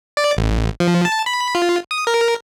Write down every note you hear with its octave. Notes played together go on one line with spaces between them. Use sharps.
D5
A1
F3
A5
B5
F4
D#6
A#4